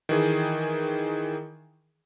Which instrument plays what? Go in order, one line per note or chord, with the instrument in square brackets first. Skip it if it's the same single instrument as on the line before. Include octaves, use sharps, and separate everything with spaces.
[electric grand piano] D#3 E3 G#4